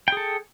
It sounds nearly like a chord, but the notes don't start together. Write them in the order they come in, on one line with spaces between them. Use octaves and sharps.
G5 G#4 A4